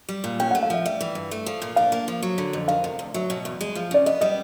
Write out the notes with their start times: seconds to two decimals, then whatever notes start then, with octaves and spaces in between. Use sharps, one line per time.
0.09 G3
0.24 A#2
0.40 C#4 G5
0.51 F#5
0.55 A3
0.63 F5
0.70 F3 E5
0.86 G3 E5
1.01 E3
1.15 G2
1.31 A3
1.46 F3
1.62 A#2
1.76 D4 F5
1.92 A#3
2.08 F3
2.23 F#3
2.38 D3
2.53 F2
2.68 D#3 F5
2.84 C3
2.99 D2
3.14 F#3 E5
3.30 B2
3.45 E2
3.61 G#3
3.75 F3
3.91 C#3 D5
4.06 B3 D#5
4.21 G3 D#5